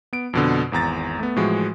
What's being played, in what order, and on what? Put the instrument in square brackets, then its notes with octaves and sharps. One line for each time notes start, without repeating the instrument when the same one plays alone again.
[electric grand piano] B3 D7
F2 B2 D3
G#1 E2 A#5 A6
A3 B3
A2 E3 F3 G#3 F#4